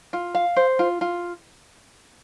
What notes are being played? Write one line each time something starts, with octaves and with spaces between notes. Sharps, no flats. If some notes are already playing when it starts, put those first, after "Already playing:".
F4
F5
C5
F4
F4